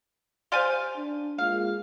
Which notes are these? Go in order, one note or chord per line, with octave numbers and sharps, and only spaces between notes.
G4 C5 D5 F5 G#5 C6
D4
G#3 A#3 F4 F5